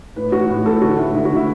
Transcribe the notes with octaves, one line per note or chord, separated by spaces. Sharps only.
A2 B4
E3 A3 F#4
A2
E3 A3 A4
D3 F#4
A3 E4
D3 E4
F#4
A3
E4